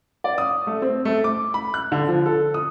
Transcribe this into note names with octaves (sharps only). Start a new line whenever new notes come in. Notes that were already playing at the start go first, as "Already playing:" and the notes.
D5
D#6
A3
C4
A3
D6
B5
F#6
D3
F3
A4
D#6